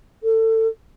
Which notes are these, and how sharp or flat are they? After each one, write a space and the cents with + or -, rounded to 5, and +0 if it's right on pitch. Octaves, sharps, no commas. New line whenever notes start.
A4 +25